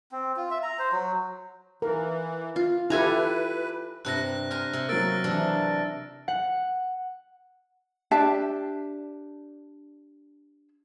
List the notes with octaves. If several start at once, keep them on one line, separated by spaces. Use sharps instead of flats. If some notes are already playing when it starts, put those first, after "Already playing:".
C4
F4
E5
A#5
C5
F#3
E3 A#4
F4
E4 G4 A4 B4 G#5 A#5
G2 C3 A#5 F#6 A#6
C5 G#5 A#5 F6
C3 G#5
F#3 A#3 E6 A6 D7
C3 E3 D4
F#5
D4 G4 E5 A5